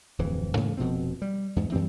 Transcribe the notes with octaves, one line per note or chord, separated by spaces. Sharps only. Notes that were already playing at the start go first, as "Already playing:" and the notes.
D1 F2 E3
G#2 C#3 E3 A#3
F1 B2 F3 C4
G3
E2 G#2
F#2 E3 G3 C4